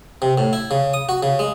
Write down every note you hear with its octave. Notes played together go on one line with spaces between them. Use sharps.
C3
A2
E4
C#3
D#6
F#4
C#3
G#3